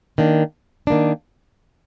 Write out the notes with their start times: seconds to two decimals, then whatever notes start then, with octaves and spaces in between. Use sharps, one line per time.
0.18 D#3 A#3 D4
0.87 D#3 A#3 D4